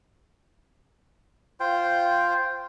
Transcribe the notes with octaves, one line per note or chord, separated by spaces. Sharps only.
F4 C5 G5